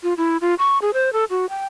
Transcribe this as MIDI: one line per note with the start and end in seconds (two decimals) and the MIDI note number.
0.03 0.14 65
0.17 0.37 64
0.41 0.54 65
0.59 0.78 85
0.82 0.91 68
0.94 1.13 72
1.13 1.25 69
1.30 1.46 66
1.49 1.66 79